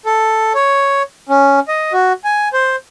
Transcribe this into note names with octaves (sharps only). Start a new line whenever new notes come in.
A4
C#5
C#4
D#5
F#4
G#5
C5